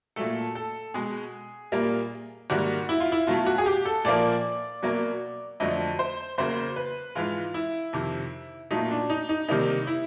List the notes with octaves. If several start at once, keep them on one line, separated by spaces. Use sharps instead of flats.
A#2 F#3 A3 A4
A4
B2 G#3 G#4
A#2 G3 A#3
G#2 D#3 G3 A#3 F#4
E4
F4
E4
B2 F#3 A3 F4
F#4
G#4
G4
A4
A#2 F3 A#3 D5
B2 F#3 A#3
F2 D3 F#3 A3 D#5
C5
E2 C#3 F#3 A#3 C5
B4
G#2 E3 G#3 F4
E4
F2 C3 D#3
A#2 F#3 A3 D#4
D4
D#4
D#4
C3 D#3 G3 A#3 D#4
E4